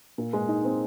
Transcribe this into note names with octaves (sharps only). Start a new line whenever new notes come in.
A#2
G#3
D#4
C4